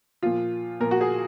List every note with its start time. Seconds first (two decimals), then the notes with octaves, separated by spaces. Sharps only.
0.22 A#2 F3 F4
0.80 A#2 F3 A#4
0.91 F#4
1.01 G#4